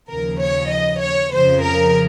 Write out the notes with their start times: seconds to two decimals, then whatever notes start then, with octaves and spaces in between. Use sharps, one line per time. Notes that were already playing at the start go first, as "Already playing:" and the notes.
0.10 D#2 C#3 F3 A#4
0.41 C#5
0.72 D#5
1.03 C#5
1.34 F2 C#3 F3 C5
1.65 A#4